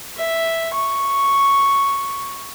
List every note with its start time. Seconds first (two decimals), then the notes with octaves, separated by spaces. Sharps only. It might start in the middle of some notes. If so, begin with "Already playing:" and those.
0.17 E5
0.73 C#6